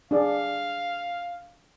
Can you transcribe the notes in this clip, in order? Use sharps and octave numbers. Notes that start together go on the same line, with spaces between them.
D4 G#4 D5 F5